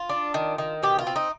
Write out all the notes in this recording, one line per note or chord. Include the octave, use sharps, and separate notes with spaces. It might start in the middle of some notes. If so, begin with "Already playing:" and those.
Already playing: F4
D4
D#3
D#3
B2 G4
F4
C4
D#4